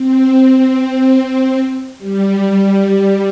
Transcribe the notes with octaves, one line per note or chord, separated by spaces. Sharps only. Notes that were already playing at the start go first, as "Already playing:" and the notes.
Already playing: C4
C4
C4
C4
G3
G3